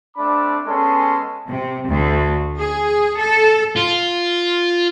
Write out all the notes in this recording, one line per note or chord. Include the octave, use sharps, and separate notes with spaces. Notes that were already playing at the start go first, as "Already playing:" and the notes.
A3 C4 D4 B5 D6
G#3 B3 C#4 A4 C6
C3
D2
G#4
A4
F4